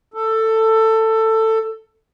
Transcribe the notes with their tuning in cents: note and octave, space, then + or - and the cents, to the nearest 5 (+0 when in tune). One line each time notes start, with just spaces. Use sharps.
A4 +15